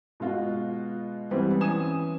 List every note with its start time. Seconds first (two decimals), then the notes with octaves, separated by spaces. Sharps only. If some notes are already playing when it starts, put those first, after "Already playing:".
0.20 B2 G#3 F4 F#4
1.31 E3 G3 G#3 B3 C4
1.61 E3 C#4 G#5 D#6 E7